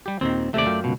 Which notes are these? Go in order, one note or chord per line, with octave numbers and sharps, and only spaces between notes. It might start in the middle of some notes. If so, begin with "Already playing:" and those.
G3 G4
D#2 A#2 D#3 C4
D#2 C3 A3 D5 E5
F#2 F4 G5
C#2 G#2 B2